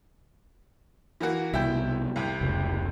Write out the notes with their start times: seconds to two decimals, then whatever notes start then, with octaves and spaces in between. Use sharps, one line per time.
1.20 E3 A#3 F#4
1.53 C2 B2 E4 G5
2.16 C2 C3
2.41 F1 C#2